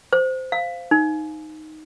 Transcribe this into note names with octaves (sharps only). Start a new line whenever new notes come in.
C5
F5
D#4